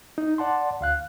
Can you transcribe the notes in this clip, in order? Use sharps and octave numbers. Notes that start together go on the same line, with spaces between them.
D#4
D5 F#5 A5 C6
D2 F5 F#6